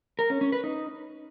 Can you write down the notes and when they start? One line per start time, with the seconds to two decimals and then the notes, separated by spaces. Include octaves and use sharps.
0.19 A#4
0.30 C#4
0.41 C#4
0.52 B4
0.64 D#4